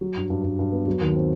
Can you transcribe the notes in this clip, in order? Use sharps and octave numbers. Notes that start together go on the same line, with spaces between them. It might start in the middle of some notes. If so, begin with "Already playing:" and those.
F#3
G2
G2
G2
G2
B3
F#3
D#2
C4